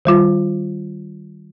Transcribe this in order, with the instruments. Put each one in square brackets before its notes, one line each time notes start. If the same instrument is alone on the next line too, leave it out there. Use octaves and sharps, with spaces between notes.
[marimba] D#3 G3 F4